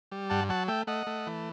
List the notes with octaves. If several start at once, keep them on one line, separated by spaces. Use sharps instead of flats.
G3
G2 F#5 A5
F#3 F#5 A5
A3 E5 G5
A3 D#5 F#5
A3
E3